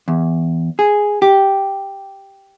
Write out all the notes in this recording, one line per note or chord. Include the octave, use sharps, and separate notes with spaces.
E2
G#4
G4